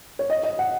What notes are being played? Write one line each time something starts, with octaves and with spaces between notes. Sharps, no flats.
C#5
D#5
D#5
F#5